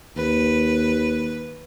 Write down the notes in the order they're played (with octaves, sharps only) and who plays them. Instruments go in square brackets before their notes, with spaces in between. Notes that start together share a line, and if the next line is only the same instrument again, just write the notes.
[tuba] D#2 [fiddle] B4